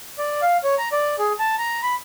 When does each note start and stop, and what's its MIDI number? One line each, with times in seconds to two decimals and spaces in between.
0.19 0.41 74
0.42 0.57 77
0.64 0.75 73
0.78 0.89 82
0.92 1.16 74
1.19 1.33 68
1.39 1.56 81
1.58 1.81 82
1.83 1.95 83